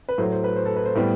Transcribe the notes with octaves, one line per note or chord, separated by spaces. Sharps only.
B4
A2 F#3 A3 C5
C5
B4
C5
A4
B4
C5
A2 G3 B3